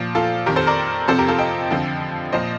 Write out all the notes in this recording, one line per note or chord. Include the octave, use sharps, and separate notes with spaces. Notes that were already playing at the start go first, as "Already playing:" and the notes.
Already playing: A#2 F3
F4 A4
F2 D#3 G4 A#4
A4 C5
A#4 D5
F2 C3 F3 A4 C5
G4 A#4
F4 A4
D#5 G5
F2 D3 F3
A#2 F3 C5 D#5